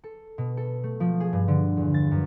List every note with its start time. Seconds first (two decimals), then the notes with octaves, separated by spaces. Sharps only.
0.04 A4
0.38 B2
0.57 A4
0.83 A3
1.00 F3
1.20 G#4
1.33 G2
1.48 D3
1.77 E2
1.94 A6
2.11 F#2